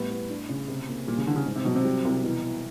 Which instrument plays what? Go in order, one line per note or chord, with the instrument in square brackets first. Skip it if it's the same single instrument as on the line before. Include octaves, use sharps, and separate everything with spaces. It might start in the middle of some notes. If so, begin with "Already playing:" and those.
Already playing: [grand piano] A2 [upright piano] G3 B3
[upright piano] B3
D4
C#3
C3
A#3
[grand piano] A#2 [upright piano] G3
[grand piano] C#3
[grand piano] D3 [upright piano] E3
[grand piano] C#3
[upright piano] G#2
[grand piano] C3
[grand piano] B2 [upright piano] F#3
[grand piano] C3
[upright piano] G3
C2
[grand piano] B2 [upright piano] E3
[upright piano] E3